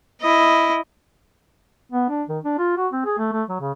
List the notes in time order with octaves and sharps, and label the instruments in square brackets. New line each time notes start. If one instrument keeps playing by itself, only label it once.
[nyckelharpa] E4 D#5
[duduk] B3
D4
D#3
D4
F4
F#4
C4
G#4
A3
A3
F#3
C#3